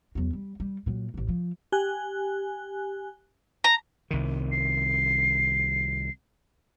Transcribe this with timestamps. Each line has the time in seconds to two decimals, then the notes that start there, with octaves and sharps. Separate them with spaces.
0.15 E2 F#3
0.33 G3
0.60 G3
0.86 A#2 F#3
1.14 A1 E3
1.29 F3
1.72 G4 G#5 F#6
3.64 A#5
4.11 C2 D#3
4.52 C7